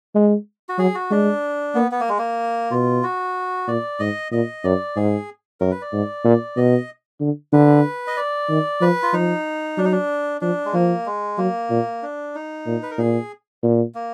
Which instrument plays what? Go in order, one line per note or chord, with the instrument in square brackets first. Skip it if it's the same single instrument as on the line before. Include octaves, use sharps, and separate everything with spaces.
[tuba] G#3
[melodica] F#4
[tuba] F#3 [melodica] G#4
[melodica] F#4
[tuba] G#3 [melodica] D4
[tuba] A#3 [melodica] B3
[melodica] B3
A#3
G#3
A#3
[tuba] B2 [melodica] F4
[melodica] F#4
[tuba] A#2 [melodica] D5
[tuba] G#2 [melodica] D#5
[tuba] A#2 [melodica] D#5
[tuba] F#2 [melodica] D5
[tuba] G#2 [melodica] G#4
[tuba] F#2 [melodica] A#4
[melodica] B4
D5
[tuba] G#2
A#2
[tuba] B2 [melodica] D#5
[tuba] D3
[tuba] D3 [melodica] B4
[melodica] D#5
D5
[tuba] D#3
[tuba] F3 [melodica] B4
[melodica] F4
[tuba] F3 [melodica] D#4
[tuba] F#3 [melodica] D4
[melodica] D#4
D4
[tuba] F3 [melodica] D4
[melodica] G#3
[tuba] F3 [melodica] A#3
[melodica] G#3
[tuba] F#3 [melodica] A#3
[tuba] A#2
[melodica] D4
D#4
[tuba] A#2
[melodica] B4
A#4
[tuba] A#2 [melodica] G#4
[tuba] A#2
[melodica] A#3